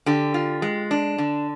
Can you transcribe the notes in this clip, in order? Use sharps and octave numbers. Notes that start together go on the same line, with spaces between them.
D3 G4
F4
G#3
D4
D3